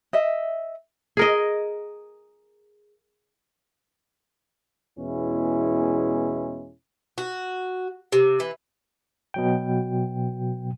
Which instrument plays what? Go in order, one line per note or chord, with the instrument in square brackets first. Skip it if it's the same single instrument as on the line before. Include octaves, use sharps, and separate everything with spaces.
[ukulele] D#5 E5
[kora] G#4 A#4 D#5
[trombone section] E2 B2 G#3 C#4 E4
[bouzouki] F#4
C3
E3
[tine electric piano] B2 F#3 G5